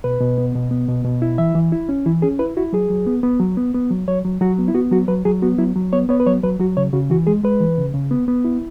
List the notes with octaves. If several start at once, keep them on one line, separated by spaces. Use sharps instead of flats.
B2 B4
B2
B3
B2
B3
B2
B2
E4
E3 E5
E3
E4
C#4
E3 E4
C#4 G#4
E4 B4
E4 F#4
F#3 G#4
F#3
B3
B3
F#3
B3
B3
F#3
F#3 C#5
F#3
F#3 F#4
B3
E4
B3 F#4
F#3 F#4
F#3 B4
F#3 G#4
B3 F#4
F#3 E4
F#3
B3 C#5
B3 C#5
B4
F#3 C#5
F#3 B4
F#3 F#4
C#3 C#5
C#3 F#4
E3 F#4
G#3 G#4
G#3 B4
E3
C#3
C#3
B3
B3
E4